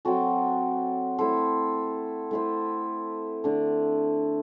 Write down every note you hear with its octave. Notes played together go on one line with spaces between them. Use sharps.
F#3 C4 F#4 A4
A3 E4 A4 C5
A3 E4 A4 C5
D3 A3 D4